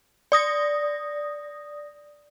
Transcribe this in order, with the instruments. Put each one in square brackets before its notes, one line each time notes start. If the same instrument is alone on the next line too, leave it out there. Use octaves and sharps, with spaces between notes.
[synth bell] D5 D#6 A#6